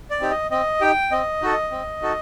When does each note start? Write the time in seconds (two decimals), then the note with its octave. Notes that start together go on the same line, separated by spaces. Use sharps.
0.10 D5
0.20 C4 D#4 G4
0.31 D#5
0.51 C4 D#5
0.81 D#4 G4 G5
1.11 C4 D#5
1.42 D#4 F#4 A4
1.71 C4
2.02 D#4 F#4 A4